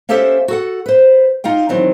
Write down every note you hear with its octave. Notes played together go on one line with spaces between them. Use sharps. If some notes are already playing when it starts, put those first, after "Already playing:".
A#3 C#4 G4 A4 C5 E5
F#4 A4 F#5
B4 C5
D#4 F4 F5 G5
D#3 E3 F#3 C4